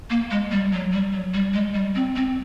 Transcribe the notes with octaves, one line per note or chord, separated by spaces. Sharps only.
A#3
G#3
G3
F#3
G3
F#3
G3
G#3
G3
C4
C4